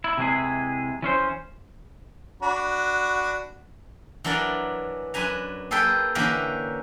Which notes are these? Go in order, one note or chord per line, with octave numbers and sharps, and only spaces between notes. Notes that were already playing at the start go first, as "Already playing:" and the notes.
E4
C3 E3 G#3 D4 E4 G#4
E3 C#4 C5
D4 F#4 B5
E3 F#3 D4 A#4 D5
F#2 D4 B4 G#5 A#5
A#3 G#4 A4 B4 G5
D3 E3 A#3 C#4 G4 A#4